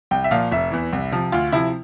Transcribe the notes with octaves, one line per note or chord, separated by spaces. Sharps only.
C2 G5
E5
A#2 F3 F5
F1 E5
E2 E3
C2
C3 F3
D2 F4
C3 F3 E4